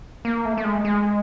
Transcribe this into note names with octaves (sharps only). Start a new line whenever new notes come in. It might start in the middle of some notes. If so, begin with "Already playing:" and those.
A#3
A3
A3
G#3
G#3